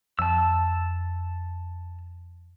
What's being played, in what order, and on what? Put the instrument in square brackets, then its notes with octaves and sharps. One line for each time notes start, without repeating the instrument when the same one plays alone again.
[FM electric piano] F2 [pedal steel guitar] A5 E6